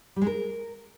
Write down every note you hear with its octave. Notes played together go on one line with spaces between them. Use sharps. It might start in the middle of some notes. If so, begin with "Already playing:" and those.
G3
G#3
A#4